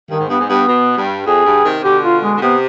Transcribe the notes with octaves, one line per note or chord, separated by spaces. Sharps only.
G2 D#3
G#2
G2 B3
G#2
G2 B3
B2
G2
F2 G#4
G2
C3 D#3
C3
B2 D3 G4
F4
G#3
D3
C3 B3